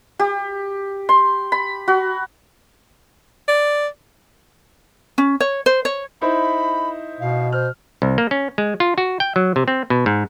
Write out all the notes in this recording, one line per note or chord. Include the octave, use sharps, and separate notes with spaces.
G4
C6
B5
F#4
D5
C#4
C#5
C5
C#5
D#4 E4 C5 B5
B2 F5
C5 F6
C2
A#3
C#4
G#3
F4
F#4
G5
F#3
C3
C4
B2
G#2